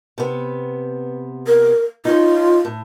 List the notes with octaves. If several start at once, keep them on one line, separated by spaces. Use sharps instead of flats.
C3 B3
A#4
D#4 F4 C#5
A2